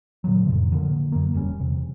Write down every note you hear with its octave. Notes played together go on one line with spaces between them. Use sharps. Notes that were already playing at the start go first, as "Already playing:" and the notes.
A#2 D3 D#3 F#3
F2 A2 C3
D3 F3 A#3
F#2 A#3
E1 G3 C#4
E2 C3